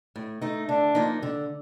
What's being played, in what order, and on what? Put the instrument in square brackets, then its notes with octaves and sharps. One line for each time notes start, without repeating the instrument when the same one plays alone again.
[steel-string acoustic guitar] A2
A3 D#4
[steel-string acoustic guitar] D3 [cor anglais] D4
[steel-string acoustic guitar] F3 A#3 D#4
D3